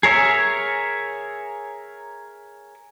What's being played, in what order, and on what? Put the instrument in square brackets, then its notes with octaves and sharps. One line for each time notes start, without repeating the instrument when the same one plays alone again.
[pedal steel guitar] G#4 A#4 C#5 E5 G#5